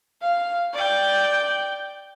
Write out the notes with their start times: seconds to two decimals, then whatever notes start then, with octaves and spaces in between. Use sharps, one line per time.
0.22 F5
0.74 D5 G5